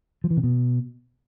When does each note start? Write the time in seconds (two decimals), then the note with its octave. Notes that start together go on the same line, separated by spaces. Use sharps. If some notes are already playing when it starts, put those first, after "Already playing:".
0.24 F3
0.30 E3
0.37 C3
0.43 B2